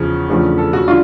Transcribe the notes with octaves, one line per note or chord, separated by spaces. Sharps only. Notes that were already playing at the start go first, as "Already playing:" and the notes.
Already playing: E2 C#3 F3
E2 C#3 F3 A3 D4
A4
F#4
D3 G3 F4